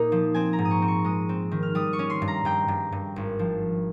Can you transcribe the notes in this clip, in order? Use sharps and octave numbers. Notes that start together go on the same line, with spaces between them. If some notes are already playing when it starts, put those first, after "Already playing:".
Already playing: A#2 A#3 D#4
F3
C4 G#5
A#5
G#2
D#6
C#6
C4
C#6
G#3 D#6
C4
D#3
F6
G3 D#6
C#6
C#4
C6
G2
A#5
G2 G5
G2
G2
G#1
F3